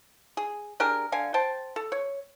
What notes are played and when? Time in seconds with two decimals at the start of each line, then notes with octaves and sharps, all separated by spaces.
0.37 G#4
0.80 D4 G4 G#4 A#4
1.12 D3 F5 G#5
1.34 C5 G5 A5
1.76 A4
1.92 C#5